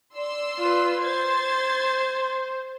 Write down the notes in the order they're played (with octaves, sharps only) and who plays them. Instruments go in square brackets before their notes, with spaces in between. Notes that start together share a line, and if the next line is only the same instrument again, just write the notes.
[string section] D5 C6 E6
[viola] F4 B4
[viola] C5 [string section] C6 G#6 A6